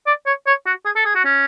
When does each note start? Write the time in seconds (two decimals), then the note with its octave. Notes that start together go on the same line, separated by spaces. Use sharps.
0.07 D5
0.26 C#5
0.47 C#5
0.66 F#4
0.85 G#4
0.96 A4
1.05 G#4
1.15 F#4
1.25 C#4